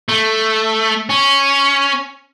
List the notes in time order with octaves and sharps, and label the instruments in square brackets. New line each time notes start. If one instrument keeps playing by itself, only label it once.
[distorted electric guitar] A3
C#4